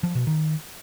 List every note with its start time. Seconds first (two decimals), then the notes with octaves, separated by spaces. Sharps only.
0.03 F3
0.15 B2
0.27 D#3